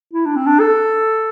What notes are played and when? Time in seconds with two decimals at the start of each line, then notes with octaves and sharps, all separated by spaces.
0.14 E4
0.26 D4
0.36 C4
0.47 D4
0.60 A4